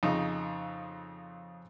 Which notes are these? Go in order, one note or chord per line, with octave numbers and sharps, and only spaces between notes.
F2 C#3 D#4